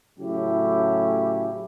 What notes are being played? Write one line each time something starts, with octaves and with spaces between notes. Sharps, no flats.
A2 C#3 F#3 C#4 E4 G4